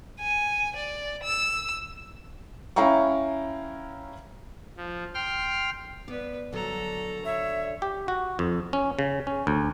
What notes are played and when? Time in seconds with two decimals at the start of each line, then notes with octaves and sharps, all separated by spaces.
0.20 G#5
0.76 D5
1.23 E6
2.76 C#4 E4 F5 G5 A#5 C#6
4.77 F3
5.14 G5 C6 F6
6.08 B3 B4 D5
6.53 D3 F#3 A4 A#5
7.25 C#5 E5
7.82 G4
8.08 F#4
8.39 F2
8.73 C#4
8.99 C#3
9.27 C#4
9.47 D2